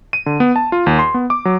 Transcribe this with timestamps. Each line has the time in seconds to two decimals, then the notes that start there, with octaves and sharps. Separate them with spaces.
0.13 D#7
0.26 D3
0.40 B3
0.56 A5
0.72 F4
0.87 D#2
0.99 C6
1.14 B3
1.30 D6
1.45 F#3